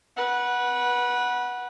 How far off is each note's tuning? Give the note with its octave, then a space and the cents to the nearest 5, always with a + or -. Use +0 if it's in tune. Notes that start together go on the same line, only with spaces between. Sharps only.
B4 -25 F#5 +0